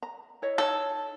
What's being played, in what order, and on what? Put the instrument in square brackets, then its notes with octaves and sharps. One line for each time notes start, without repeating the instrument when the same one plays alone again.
[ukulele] A#5
E4 C#5 D#5
[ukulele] D#4 C#5 A5 [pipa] A4